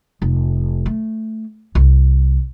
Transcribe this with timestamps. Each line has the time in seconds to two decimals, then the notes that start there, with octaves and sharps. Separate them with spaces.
0.22 F1
0.86 A3
1.75 C2